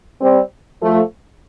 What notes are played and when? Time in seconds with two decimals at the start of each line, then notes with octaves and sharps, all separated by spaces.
0.21 G3 C4
0.82 F3 A3